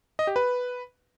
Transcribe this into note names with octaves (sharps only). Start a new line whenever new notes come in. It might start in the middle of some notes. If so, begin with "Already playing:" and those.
D#5
G4
B4